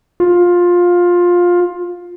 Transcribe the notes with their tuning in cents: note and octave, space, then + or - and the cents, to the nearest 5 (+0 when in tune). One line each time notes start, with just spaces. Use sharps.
F4 +15